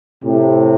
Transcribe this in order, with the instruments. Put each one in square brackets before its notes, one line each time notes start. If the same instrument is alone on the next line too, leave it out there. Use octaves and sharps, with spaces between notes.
[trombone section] A2 C3